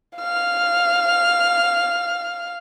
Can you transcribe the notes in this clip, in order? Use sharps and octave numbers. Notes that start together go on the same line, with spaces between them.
F5 F6